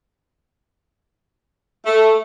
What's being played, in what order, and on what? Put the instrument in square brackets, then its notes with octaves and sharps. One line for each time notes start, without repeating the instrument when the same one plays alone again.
[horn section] A3